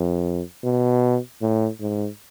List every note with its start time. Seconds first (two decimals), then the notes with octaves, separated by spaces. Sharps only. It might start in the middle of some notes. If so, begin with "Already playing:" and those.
Already playing: F2
0.64 B2
1.42 A2
1.80 G#2